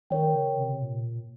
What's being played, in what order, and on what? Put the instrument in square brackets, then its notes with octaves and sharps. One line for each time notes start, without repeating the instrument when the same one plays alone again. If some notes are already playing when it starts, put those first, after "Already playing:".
[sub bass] D#3 [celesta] A#4 C#5 G5
[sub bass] C#3
C3
A#2